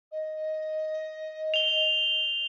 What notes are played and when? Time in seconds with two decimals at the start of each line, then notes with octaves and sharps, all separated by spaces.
0.12 D#5
1.54 F7 G7